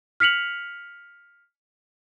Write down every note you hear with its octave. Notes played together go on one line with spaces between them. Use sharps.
F6 B6 C#7 F7 F#7